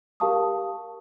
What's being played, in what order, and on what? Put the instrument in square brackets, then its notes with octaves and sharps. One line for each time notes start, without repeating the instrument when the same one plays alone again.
[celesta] G4 A#4 F5 A5 C#6 D#6